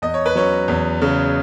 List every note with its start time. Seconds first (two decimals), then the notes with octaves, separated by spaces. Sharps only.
0.02 E2 D#5
0.14 C#5
0.26 B4
0.35 F#3 C#4 C#5
0.68 E2
1.01 C#3